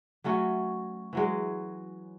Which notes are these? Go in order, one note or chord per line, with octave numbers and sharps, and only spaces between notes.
F#3 A3 C#4 F#4
E3 F#3 G#3